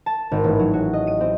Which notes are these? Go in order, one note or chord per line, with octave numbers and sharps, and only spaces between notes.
A5
G#1
A1
F#3
F#4
D#5
D#7
C4